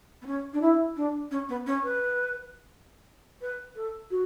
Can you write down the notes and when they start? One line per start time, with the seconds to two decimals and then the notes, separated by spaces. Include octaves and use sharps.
0.22 B3
0.26 C#4
0.53 D4
0.62 E4
0.96 D4
1.31 C#4
1.49 B3
1.66 C#4
1.83 B4
3.41 B4
3.75 A4
4.11 F#4